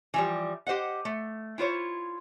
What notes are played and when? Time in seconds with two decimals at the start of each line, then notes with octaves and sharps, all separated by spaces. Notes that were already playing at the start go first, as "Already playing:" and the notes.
0.14 E3 F3 G3
0.67 G4 C5 D#5 F#5
1.05 A3
1.58 E4 F4 C5 C#5